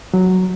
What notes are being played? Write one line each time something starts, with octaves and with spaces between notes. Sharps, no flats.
F#3